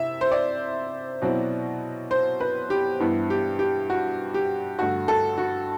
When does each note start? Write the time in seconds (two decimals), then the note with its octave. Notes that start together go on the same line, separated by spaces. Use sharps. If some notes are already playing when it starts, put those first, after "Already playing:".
Already playing: C3 E4 E5
0.21 C5
0.31 D5
1.22 B2 F#3 C4 E4
2.11 C5
2.40 B4
2.70 G4
3.00 G2 E3 B3 E4
3.30 G4
3.59 G4
3.90 F#4
4.34 G4
4.78 G2 D3 A3 F#4
5.08 A4
5.38 F#4